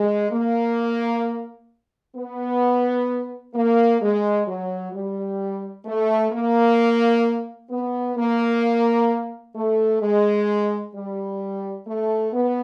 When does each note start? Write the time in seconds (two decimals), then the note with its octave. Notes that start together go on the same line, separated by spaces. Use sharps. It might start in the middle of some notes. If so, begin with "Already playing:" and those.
Already playing: G#3
0.31 A#3
2.16 B3
3.54 A#3
4.01 G#3
4.47 F#3
4.93 G3
5.85 A3
6.32 A#3
7.70 B3
8.17 A#3
9.55 A3
10.01 G#3
10.94 G3
11.86 A3
12.33 B3